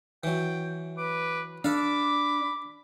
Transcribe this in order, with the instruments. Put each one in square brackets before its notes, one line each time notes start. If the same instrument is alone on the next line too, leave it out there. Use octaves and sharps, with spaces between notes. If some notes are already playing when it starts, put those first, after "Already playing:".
[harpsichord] E3 F#3 [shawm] G5
[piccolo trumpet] B4 [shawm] D6
[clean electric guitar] D4 [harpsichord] A4 F5 [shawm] B5 [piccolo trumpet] D6